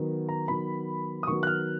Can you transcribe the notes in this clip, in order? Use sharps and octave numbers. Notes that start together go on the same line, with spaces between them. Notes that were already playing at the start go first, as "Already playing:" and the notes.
Already playing: D#3 F#3 B3
A#5
D#3 F#3 B3 B5
D#6
D#3 F#3 B3 C#6
F#6
F6